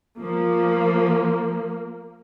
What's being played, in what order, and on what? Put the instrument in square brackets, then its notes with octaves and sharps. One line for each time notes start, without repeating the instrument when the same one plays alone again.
[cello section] F3 [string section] A#3